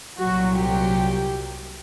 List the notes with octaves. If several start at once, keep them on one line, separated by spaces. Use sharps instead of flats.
C2 A#2 F#3 F#4
G4